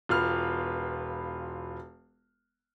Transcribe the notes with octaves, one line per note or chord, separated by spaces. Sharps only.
E1 F4 B4 F6